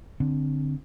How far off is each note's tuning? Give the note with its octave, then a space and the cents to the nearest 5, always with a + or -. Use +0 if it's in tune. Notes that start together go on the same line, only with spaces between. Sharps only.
D3 +0 C4 +0